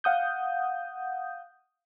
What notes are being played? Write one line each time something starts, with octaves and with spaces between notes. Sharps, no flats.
F5 F#5 D#6 G6